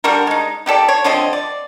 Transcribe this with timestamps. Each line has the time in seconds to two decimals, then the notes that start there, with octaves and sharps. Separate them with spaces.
0.04 D3 G3 F#4 A#4
0.27 G#3 D#4
0.66 D#4 G4 A4 D5
0.88 C#5
1.04 D3 F3 C4 D#5
1.33 D5